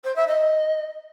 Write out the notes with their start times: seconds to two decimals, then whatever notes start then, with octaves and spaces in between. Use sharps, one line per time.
0.04 C5
0.15 E5
0.27 D#5